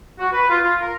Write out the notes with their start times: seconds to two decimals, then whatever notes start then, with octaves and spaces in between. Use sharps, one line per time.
0.19 F#4
0.33 B4
0.50 F4
0.63 F4
0.81 A#4